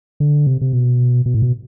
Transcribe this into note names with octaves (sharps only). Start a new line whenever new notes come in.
D3
C3
C3
B2
B2
A2
B2